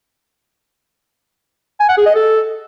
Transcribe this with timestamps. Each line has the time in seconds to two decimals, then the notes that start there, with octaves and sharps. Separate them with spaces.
1.80 G#5
1.89 F#5
1.97 G#4
2.06 D#5
2.15 A4